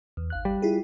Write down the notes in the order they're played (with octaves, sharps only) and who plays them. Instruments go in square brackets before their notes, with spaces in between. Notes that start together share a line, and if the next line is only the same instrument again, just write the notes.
[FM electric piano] E2
G#1 F5 F#6
[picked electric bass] G3
[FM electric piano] E4 F4 G#4